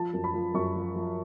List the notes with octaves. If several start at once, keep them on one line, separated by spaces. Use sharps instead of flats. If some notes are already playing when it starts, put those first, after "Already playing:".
Already playing: F3 A5
F#2
B5
F3
F#2 C#6
F3
F3